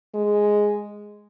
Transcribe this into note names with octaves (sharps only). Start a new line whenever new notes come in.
G#3